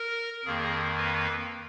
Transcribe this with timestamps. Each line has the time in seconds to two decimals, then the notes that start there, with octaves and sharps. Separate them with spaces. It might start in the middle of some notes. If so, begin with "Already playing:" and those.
Already playing: A#4
0.45 F2 D#3 A#3 G#4
0.97 B4